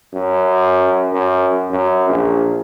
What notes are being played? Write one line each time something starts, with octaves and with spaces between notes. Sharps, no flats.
F#2
F#2
F#2
A#1